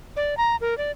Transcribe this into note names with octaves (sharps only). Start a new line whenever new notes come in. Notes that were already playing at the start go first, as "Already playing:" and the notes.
D5
A#5
A#4
D5